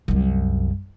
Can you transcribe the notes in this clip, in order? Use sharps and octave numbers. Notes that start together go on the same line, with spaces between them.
C2 F#2